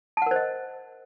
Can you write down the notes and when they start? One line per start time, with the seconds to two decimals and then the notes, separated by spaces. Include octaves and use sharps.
0.17 A5
0.22 F#5
0.26 A#4
0.31 C5
0.36 D#5